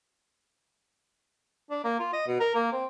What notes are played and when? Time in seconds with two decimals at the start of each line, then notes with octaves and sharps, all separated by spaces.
1.70 D4
1.84 A#3
1.99 F4
2.13 D#5
2.28 B2
2.40 A#4
2.55 A#3
2.72 C4